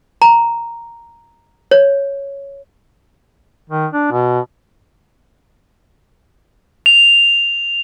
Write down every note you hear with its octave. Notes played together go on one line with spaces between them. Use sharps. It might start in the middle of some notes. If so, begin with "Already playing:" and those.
A#5
C#5
D#3
D4
B2
F7